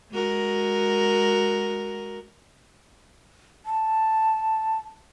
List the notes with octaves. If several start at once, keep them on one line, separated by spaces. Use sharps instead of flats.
G#3 F#4 A#4
A5